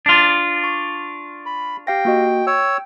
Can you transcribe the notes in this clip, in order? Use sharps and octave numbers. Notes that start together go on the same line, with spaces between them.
D4 F4
C#6
B5
G4 F5 G5 A#6
A#3 F#4 D#5
C#5 G5 E6